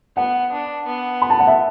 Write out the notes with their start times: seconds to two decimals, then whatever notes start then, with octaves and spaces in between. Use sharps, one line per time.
0.16 B3 F#5
0.52 D4
0.86 B3
1.22 B5
1.30 A5
1.40 F#5
1.47 E5